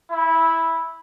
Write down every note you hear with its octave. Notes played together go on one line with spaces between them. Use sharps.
E4